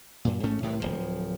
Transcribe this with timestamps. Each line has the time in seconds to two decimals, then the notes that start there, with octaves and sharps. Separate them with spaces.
0.25 F#2 A#2
0.43 A1 G#2 A3 C#4
0.62 C2 A2 C3 E3
0.80 D1 C#2 F3